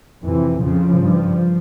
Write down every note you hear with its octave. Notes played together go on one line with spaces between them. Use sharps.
F2 C3 E3
F2 C#3 F3
G2